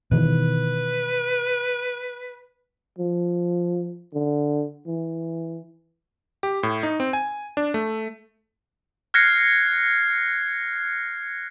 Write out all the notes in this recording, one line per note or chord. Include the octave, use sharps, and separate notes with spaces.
B2 D#3 E3 B4
F3
D3
E3
G4
A2
D#4
C4
G#5
D4
A3
F6 F#6 G#6 A#6 C7 C#7